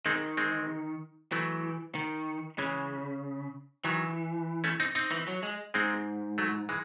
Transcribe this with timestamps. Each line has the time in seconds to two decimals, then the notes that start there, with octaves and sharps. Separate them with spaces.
0.06 D#3 G#3 C4
0.37 G#3 C4
1.32 E3 F#3 A3
1.95 D#3
2.58 C#3 E3 G#3
3.84 D#3 E3 F#3
4.64 A3 C#4
4.80 C4 D#4
4.95 C4 D#4
5.11 E3
5.28 F#3
5.43 G#3
5.74 G#2 G#3 C4
6.38 F#3 A3
6.69 E3 G#3